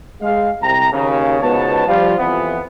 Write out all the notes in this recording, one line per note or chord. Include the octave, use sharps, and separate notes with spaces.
G#3 F5
C2 C3 G5 A#5
D#2 C#3
C#2 G#2 B2 B3 C#5 A5
F3 G3 F4
F2 E3 B3